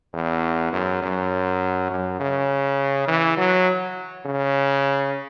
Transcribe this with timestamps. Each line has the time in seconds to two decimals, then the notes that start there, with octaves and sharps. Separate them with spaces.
0.14 E2
0.73 F#2
1.02 F#2
1.90 F#2
2.20 C#3
3.08 E3
3.38 F#3
4.26 C#3